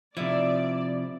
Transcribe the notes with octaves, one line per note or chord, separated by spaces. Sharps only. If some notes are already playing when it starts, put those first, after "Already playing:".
C3 F3 E4 D5